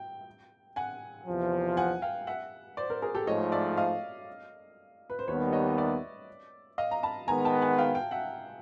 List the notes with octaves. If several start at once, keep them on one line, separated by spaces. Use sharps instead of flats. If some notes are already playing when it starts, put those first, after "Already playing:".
Already playing: G5
F#5 G#5
E2 C3 F3
F#5 G#5
F5 G5
E5 F#5
C5 D5
A#4 C5
G#4 A#4
G4 A4
G#2 F3 A3 C#5 D#5
D5 E5
D#5 F5
B4
C5
D#2 D#3 G3 B3 B4 C#5
C#5 D#5
D5 E5
D#5 F5
A#5
A5 B5
D#3 G#3 B3 G#5 A#5
G5 A5
F#5 G#5
F5 G5
F5 G5
E5 F#5